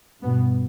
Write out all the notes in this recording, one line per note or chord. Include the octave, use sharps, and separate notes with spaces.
G2 B2 B3